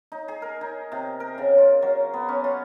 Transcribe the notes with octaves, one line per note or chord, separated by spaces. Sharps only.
D#4
G#4
A#4
D#4
C3
A#4
C#3
F4
F#3
B3
C#4
F4